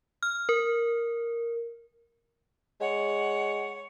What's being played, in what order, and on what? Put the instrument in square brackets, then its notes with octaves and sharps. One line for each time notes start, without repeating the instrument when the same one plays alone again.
[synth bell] F6
A#4
[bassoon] G#3 [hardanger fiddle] C#5 [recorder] F#5